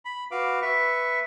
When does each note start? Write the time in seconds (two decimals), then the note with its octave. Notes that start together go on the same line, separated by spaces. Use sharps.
0.05 B5
0.31 F#4 B4 F5 D6
0.62 B4 E5 C#6